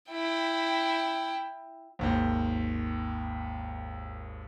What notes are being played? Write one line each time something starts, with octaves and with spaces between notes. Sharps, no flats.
E4 G5
G#1 D#2 C5